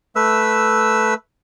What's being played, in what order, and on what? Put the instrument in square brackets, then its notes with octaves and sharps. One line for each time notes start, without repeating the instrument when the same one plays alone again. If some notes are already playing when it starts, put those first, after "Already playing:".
[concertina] A3 B4 E5 E6